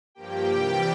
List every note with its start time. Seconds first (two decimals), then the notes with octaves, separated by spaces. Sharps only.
0.15 G2 F3 A#3 G4 G5
0.48 C3 E3 G3